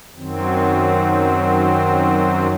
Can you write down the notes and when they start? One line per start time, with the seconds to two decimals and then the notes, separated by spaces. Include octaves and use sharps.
0.17 F#2 D#3 F#3 C4